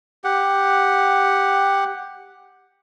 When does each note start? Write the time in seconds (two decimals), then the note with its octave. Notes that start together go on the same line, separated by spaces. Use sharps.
0.24 G4 F#5